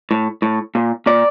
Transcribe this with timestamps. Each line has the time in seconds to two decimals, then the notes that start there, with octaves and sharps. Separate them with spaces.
0.11 A2
0.42 A2
0.75 A#2
1.06 A#2 D5